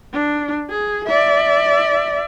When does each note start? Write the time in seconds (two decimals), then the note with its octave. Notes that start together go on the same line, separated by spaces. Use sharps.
0.13 D4
0.70 G#4
1.06 D5 E5